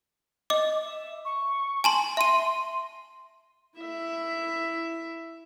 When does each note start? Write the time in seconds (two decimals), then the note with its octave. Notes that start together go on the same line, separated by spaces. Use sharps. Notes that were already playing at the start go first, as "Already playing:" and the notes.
0.50 D#5 D6
0.83 E5
1.25 C#6
1.84 G#5 A5 C6
2.17 E5 C6 D#7
3.77 E4 E5